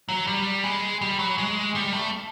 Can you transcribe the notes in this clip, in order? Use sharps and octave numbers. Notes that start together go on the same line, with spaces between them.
F#3
G3
G#3
G3
F#3
G#3
G3
A3